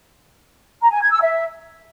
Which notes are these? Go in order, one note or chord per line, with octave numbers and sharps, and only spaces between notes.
A#5
G#5
G#6
E6
E5